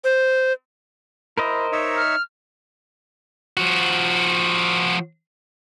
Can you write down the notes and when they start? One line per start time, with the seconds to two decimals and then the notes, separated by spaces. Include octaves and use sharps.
0.04 C5
1.38 E4 A#4 C5 D#5
1.72 D#4 C#5 E5
1.96 F6
3.57 F3 F#4